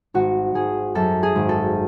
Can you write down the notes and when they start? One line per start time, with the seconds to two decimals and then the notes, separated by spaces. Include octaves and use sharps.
0.14 G#1 F#4
0.54 G#1 G#4
0.95 F#2 A4
1.23 G#4
1.35 G#1
1.49 A4